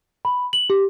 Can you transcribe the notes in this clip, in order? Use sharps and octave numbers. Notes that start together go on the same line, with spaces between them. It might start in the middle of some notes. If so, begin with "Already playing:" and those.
B5
F#7
G4